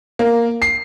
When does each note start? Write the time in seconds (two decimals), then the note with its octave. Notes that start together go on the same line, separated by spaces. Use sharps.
0.19 A#3
0.62 C7